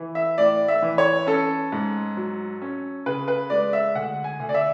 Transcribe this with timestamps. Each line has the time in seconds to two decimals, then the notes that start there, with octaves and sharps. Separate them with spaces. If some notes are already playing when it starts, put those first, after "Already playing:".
Already playing: E3
0.15 E5
0.38 A2 D5
0.68 E5
0.82 E3
0.98 C#5
1.27 C#4 A4
1.72 G#2
2.17 F#3
2.62 C#4
3.06 C#3 B4
3.28 B4
3.50 G#3 D5
3.73 E5
3.95 D2 F#5
4.24 G#5
4.40 D2
4.49 D5
4.54 E5